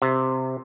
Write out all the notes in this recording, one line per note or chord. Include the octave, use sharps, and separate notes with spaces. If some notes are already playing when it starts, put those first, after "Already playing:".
C3